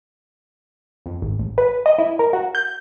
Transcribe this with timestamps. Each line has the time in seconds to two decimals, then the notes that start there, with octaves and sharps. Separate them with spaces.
1.06 F2
1.22 G#1
1.39 A1
1.58 B4
1.86 D#5
1.98 E4
2.19 A#4
2.33 F#4
2.55 G6